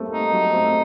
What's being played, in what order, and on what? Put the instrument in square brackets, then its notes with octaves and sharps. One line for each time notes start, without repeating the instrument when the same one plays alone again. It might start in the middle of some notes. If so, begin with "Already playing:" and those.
Already playing: [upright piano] G3 A3 A#3 C4
[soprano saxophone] D#4
[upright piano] F#3 A3
A3 C4